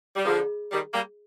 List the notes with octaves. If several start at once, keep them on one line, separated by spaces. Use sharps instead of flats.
G3
D3 F3 F4 G#4 D#5 A#5
D#3 G3
G3 A#3